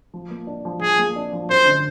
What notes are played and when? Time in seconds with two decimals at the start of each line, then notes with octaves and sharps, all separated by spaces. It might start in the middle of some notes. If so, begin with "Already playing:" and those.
0.14 F3
0.31 A#3
0.47 D4
0.65 F3
0.81 F3 G#4
0.98 A#3
1.16 D4
1.33 F3
1.49 F#2 C5
1.66 D3